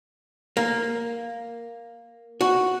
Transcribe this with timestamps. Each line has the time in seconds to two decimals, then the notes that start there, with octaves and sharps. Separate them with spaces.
0.57 A#3
2.41 F#4